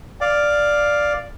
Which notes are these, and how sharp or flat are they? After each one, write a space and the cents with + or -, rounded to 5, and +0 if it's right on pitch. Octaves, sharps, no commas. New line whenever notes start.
D5 +0 F5 +0